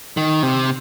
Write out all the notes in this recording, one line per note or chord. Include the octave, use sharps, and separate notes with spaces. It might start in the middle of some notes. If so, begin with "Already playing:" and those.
D#3
C3